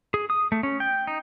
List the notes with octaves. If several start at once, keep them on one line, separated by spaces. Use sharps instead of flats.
G#4
D#6
A3
C#4
G5
D#4